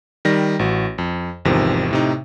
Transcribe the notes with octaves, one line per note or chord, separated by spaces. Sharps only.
D#3 G3 A#6
A1 F#4
F2
G#1 E2 C3 D#3 F3
A2 C3 D#4